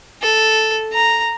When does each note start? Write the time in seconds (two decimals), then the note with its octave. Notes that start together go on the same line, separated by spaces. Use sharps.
0.22 A4
0.93 A#5